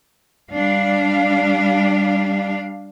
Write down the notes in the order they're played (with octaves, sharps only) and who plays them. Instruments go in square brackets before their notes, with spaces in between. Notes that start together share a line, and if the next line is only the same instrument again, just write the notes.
[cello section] G3 D4 F5